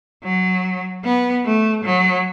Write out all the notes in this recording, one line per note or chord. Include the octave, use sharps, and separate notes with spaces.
F#3
B3
A3
F#3